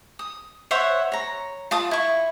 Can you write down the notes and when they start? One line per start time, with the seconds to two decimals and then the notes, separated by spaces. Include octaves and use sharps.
0.19 D#6
0.71 C5 C#5 E5 F#5
1.12 C#5 A#5
1.71 F4 A5 D#6
1.91 E4 C#6